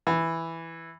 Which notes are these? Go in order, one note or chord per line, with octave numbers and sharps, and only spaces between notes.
E3